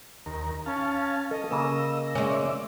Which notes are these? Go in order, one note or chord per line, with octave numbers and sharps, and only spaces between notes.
D#2 A#4
C#4 F5 A5
A4 D#5
C#3 A#3 E6
G#3 C#4 D5 E5